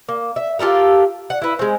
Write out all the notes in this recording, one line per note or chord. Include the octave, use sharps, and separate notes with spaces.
A#3
E5
F4 G4 A4 A#4
F#5
E4 B4
G#3 C4